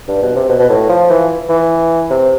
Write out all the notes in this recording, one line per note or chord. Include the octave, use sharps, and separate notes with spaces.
G2
B2
C3
B2
B2
A2
F3
E3
E3
C3